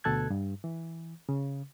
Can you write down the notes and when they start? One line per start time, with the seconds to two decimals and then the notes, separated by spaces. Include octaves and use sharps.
0.04 D2 B2 A4 A5 F#6 G#6
0.30 G2
0.64 E3
1.29 C#3